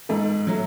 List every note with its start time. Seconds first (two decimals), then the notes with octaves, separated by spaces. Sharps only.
0.09 G#2 A4
0.47 F#3 A3